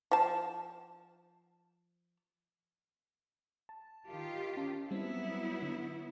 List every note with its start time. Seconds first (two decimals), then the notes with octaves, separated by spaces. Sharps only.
0.11 F3 A5
3.69 A5
4.06 D#3 F4 G4
4.57 C#4 A5
4.91 F#3 G3 B3 C4 E4
5.62 D3